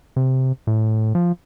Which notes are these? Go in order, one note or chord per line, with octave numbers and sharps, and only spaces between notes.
C3
A2
F3